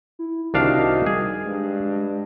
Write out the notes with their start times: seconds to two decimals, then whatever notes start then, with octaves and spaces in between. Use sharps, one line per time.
0.19 E4
0.54 C2 D#3 D4 F#4 F5
1.06 G3 G#4
1.46 G2 G#3